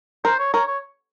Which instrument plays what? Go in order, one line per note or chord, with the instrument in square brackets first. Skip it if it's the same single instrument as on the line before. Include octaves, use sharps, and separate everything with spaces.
[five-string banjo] A#4 [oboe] C5
[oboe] C#5
[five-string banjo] A#4 [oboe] C#5
[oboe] C#5